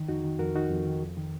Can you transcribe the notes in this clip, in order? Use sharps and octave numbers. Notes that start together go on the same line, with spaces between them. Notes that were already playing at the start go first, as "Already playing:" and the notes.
Already playing: D#3
F2 D#4 F#4
D#3
F2 F#4 A#4
D#3 D#4 F#4
F2
D#3
F2
D#3